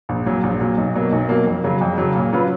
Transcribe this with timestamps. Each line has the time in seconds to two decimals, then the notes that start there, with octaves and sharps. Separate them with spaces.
0.09 A#1
0.26 A#2 F#3
0.43 A#1
0.60 A#2 F#3
0.78 B1
0.95 B2 F#3 A#3
1.12 B1
1.29 B2 F#3 A#3
1.46 F2
1.64 C#3 F#3
1.81 F2
1.98 C#3 F#3
2.15 A#2
2.33 F#3 C#4 F4 B4